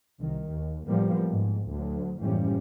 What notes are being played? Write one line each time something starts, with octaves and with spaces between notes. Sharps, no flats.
C2 D#3
D#2
A2 F3 G3 A#3 B3
G#2
D2 F#3
F#1 A2 E3 F3 G3 C#4